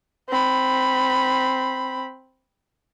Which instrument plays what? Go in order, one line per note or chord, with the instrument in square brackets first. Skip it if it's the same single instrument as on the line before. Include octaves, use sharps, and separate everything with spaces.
[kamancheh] C4 B5